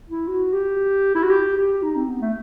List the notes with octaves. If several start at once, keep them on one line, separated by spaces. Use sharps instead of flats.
E4
F#4
G4
E4
F#4
G4
G4
D#4
C4
B3
A3